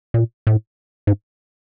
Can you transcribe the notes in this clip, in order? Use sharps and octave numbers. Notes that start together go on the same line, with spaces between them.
A#2
A2
G#2